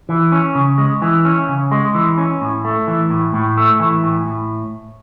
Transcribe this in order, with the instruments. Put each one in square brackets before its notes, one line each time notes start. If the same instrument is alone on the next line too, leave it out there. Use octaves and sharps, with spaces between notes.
[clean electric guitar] E3
C#4
C#3
G#3
E3
C#4
C#3
G#3
E3
C#4
A2
A3
E3
A2
A2
A3
E3
A2
A2